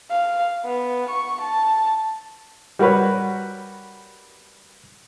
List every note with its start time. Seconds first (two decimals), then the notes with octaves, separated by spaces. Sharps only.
0.11 F5
0.65 B3
1.10 C#6
1.42 A5
2.79 G3 F#4 A#4 B4 C#5